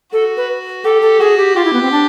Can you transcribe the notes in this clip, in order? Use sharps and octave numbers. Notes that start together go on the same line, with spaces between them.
F#4 A4
B4
G4 A4
A4
F#4 G#4
G4
F4 G4
E4
B3
C4
D4